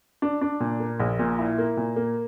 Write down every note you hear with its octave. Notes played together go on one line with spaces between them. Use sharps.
D4
D4
A#2
A#3
A#1
A#2
E4
A#3
A#2
A#3